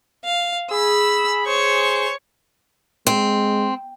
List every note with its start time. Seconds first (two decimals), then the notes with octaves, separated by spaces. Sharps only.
0.25 F5
0.71 G#4 B5 E6
1.46 C5 C#5 C#6
3.07 G#3 C4